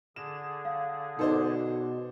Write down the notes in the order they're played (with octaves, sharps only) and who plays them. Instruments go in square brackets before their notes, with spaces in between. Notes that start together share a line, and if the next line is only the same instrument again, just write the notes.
[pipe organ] D3 G#4 [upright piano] E7
[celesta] F5
[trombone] B2 [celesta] D#4 D#5 [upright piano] A4 C5 D5